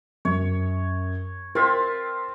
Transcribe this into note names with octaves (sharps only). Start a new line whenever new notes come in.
F#2 C#5
C4 F4 A#4 E5